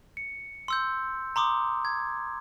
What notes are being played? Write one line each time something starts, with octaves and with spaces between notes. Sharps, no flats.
C#7
C6 E6 G6
A#5 C6 D6 D#6
G#6